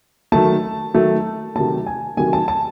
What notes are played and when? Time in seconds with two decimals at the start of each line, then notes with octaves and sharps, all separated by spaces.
0.32 D#3 F#3 A3 A5
0.94 D#3 F#3 A3
1.55 C3 D#3 F#3 A3 A5
1.87 G#5
2.17 C3 D#3 F#3 A3 G#5
2.33 A5
2.48 A5